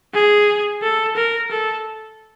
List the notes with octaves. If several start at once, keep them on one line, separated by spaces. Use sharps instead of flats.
G#4
A4
A#4
A4